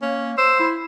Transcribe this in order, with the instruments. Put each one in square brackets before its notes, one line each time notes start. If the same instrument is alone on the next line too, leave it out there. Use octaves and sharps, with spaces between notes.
[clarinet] A#3 [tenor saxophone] C#4
[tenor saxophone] C5 [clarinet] E6
[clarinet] E4